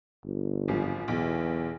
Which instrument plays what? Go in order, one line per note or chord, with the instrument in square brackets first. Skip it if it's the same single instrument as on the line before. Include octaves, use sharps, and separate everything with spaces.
[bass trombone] G1
[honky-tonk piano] G#1 F#2 F3
[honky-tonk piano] B1 [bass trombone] E2